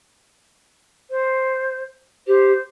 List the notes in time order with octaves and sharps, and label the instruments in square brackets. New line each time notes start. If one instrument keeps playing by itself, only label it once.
[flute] C5
[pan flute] G4 [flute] C5